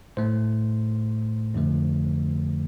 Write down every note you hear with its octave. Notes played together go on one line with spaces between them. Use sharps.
A2 A3 C5
F2 D3 F3 A3